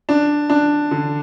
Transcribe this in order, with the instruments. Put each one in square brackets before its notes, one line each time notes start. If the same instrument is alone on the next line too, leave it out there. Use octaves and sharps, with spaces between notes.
[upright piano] D4
D4
D3